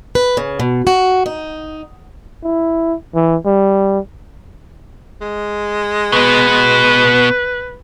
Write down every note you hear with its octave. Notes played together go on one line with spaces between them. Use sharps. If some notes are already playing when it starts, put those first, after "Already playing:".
B4
C#3
B2
F#4
D#4
E4
E3
G3
G#3
B2 B3 B4